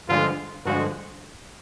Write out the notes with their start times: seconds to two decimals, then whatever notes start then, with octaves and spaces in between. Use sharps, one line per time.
0.09 G2 D3 F3 G#3 F4
0.66 G2 D3 F3 G#3 F#4